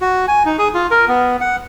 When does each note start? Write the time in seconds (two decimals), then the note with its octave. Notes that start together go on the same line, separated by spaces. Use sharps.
0.01 F#4
0.28 G#5
0.45 D#4
0.58 G#4
0.74 F4
0.91 A#4
1.08 B3
1.41 F#5